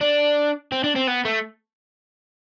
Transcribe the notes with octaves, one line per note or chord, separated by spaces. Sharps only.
D4
C4
D4
C4
B3
A3